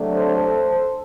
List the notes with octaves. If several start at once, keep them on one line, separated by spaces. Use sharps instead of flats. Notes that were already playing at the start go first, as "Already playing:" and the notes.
Already playing: C3 F#3 A3 D4
A4 C5